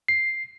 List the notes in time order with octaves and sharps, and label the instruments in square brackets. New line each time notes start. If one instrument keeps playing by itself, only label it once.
[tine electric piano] C7